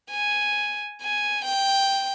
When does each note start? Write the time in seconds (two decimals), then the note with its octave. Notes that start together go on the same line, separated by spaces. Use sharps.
0.11 G#5
1.02 G#5
1.45 G5